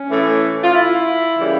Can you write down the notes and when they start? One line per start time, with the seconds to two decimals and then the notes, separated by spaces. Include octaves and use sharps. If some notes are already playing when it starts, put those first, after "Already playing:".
Already playing: C#4
0.10 A2 E3 A3
0.63 F4
0.74 E4
1.37 C#3 E3 G3 A#3